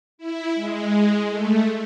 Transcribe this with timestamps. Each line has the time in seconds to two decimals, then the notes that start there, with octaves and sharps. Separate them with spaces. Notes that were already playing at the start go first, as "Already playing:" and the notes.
0.18 E4
0.54 G#3
1.28 A3